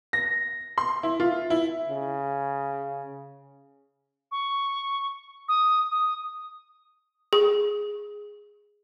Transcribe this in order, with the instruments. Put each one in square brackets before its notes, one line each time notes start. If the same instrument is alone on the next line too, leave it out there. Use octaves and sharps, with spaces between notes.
[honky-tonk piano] A#6
C6
E4
F4
E4
[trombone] C#3
[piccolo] C#6
D#6
D#6
[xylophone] G#4